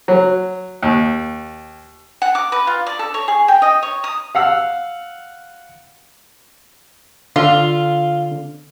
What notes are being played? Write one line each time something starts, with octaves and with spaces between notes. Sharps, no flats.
F#3
D#2
F#5
D6
B4
F4
D5
A4
C#5
G#4
G5
D#5
C#5
D#6
F5 F#5 E6
D3 F4